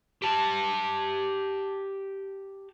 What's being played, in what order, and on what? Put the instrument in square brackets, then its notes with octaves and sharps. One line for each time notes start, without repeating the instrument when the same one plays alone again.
[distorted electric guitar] G4 A5